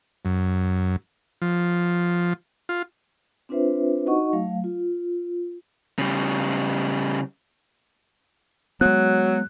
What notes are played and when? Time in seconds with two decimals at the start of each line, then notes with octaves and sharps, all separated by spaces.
0.25 F#2
1.42 F3
2.69 F4
3.49 C4 D4 F4 B4 C5 E5
4.06 D#4 F#4 D#5 F#5 C#6
4.33 F#3 A3 F5
4.64 F4
5.99 C#3 G3
8.81 F#3 G#3 B3 F#6